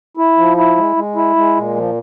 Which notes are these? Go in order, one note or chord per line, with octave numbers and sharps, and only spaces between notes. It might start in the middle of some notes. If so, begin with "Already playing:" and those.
E4
F3
E4
G#3
G#3
E4
G#3
A#2
F3